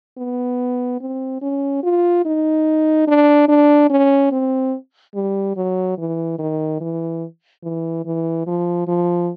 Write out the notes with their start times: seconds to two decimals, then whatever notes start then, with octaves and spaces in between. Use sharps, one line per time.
0.17 B3
1.00 C4
1.41 C#4
1.83 F4
2.25 D#4
3.07 D4
3.48 D4
3.90 C#4
4.32 C4
5.15 G3
5.56 F#3
5.98 E3
6.39 D#3
6.80 E3
7.63 E3
8.05 E3
8.46 F3
8.87 F3